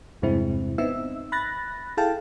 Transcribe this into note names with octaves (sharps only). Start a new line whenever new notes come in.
E2 G2 C3 G#3 C4 E4
B3 C4 D#4 E5 E6
B5 F#6 A6 A#6
E4 G#4 A4 F5 G5 A5